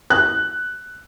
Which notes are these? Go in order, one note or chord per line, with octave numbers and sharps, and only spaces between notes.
F#6